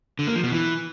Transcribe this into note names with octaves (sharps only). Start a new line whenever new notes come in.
D3
A#3
F3
B2
E3